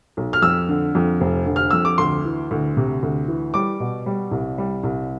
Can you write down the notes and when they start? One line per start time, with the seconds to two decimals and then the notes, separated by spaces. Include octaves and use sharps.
0.17 B1
0.33 F6
0.42 F2 E6
0.69 D3
0.95 F2
1.21 F1
1.46 D3
1.56 F6
1.71 F2 E6
1.85 D6
1.98 D2 C6
2.25 E3
2.51 D2
2.77 C3
3.03 D2
3.28 E3
3.54 G3 D6
3.80 B2
4.06 G3
4.31 C2
4.58 G3
4.83 C2